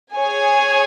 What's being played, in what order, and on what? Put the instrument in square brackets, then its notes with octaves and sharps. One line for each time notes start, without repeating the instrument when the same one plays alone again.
[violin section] G#4 C#5 G#5